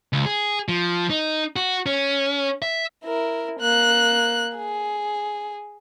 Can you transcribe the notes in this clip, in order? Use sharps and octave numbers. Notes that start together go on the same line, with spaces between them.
C#2
G#4
F3
D#4
F#4
C#4
E5
E4 A#4
A#3 F#6
G#4